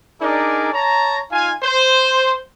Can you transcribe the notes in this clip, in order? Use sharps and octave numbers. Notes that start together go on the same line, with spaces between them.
D4 D#4 G#4 A#4 D5
C#5 A5 A#5
D#4 F4 F5 G#5
C5